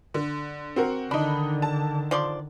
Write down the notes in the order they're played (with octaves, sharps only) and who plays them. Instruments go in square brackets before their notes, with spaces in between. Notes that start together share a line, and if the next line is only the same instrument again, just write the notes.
[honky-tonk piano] D3
C4 F#4 A#4
[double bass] D3 D#3 [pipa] D4 [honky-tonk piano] D#4 B5
[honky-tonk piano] A5
[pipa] F3 D5 C6